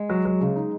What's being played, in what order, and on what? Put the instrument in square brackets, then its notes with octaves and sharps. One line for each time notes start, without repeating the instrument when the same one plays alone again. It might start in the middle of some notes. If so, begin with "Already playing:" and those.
Already playing: [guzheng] G#3
[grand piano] F#3
F#3
C#3
D#4